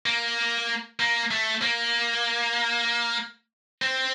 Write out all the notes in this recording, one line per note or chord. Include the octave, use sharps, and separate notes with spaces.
A#3
A#3
A3
A#3
C4